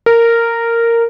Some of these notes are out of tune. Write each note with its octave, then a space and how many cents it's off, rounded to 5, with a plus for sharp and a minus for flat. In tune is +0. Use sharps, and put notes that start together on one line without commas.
A#4 -10